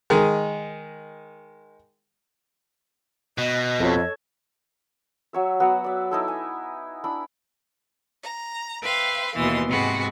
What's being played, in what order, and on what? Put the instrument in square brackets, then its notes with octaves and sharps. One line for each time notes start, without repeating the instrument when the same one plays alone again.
[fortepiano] D#3 G#3
[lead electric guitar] B2 [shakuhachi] D#5
[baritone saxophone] F2 [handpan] A4 C#5
[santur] F#3 C#5 E5
F#3 B3 F#5
D5 E5
D#4 E4 A4
G#5
D4 E4 B5
[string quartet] A#5
B4 C5 E5 F5 G5
D#2 B2 E3 C6
G#2 C3 G#3 B3 F#4